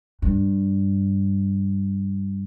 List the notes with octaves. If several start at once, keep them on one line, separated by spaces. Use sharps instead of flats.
G2